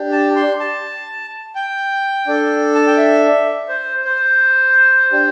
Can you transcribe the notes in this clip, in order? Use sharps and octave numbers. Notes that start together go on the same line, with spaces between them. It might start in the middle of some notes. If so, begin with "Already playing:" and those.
Already playing: D4 G4
A5
C6
A5
G5
D4 A4
A5
G5
E5
C5
C5
D4 G4